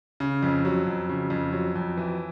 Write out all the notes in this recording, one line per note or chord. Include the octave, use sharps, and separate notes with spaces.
C#3
F2
F#3
F2
C#3
F2
F#3
F2
E3